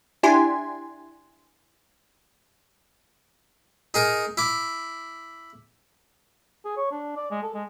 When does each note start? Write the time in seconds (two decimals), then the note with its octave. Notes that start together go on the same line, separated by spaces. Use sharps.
0.23 D4 E4 G4 G#5 C6
3.94 D#4 G#4 A#4
4.37 E4 D6
6.65 G#4
6.77 C#5
6.91 D4
7.16 D5
7.31 G#3
7.43 A4
7.54 G#3